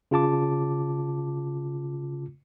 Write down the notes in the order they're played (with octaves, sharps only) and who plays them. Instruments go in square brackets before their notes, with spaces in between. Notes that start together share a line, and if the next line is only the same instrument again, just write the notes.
[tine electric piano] C#3 F4 A5 D6